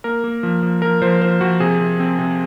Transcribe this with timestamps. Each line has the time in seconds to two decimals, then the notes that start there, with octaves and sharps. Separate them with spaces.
0.04 A#3 A#4
0.24 A#3
0.43 F3
0.63 F3
0.82 F3 A#4
1.02 F3 C5
1.21 F3 C5
1.41 F3 F#4
1.60 C3 G#4
1.80 C3
2.00 C4
2.19 C3